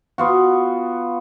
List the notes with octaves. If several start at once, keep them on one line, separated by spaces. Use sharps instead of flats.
B3 F4 F#4